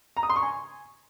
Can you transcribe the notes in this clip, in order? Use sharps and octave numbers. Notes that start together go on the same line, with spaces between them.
A#5
D#6
C6
C#6
G#5